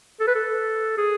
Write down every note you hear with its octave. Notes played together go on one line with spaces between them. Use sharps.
A4
B4
A4
G#4